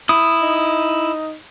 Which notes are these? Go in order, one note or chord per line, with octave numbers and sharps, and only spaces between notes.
E4 D#6
D#4